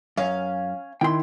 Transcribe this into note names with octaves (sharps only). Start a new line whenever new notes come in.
F#2 C#4 F5
D#3 E4 G5 C6